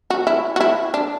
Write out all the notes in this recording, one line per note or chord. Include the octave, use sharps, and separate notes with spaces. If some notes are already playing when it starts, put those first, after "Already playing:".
F#4
E4
F#4
E4
D4